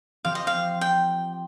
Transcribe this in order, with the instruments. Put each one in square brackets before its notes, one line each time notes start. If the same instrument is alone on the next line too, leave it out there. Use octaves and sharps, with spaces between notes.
[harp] F3 C4 G4 [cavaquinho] F5
[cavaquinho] D#5
F5
G5